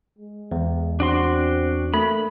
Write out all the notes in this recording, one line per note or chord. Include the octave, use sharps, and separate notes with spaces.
G#3
E2
C4 D4 F#4 C6
A3 A#3 B5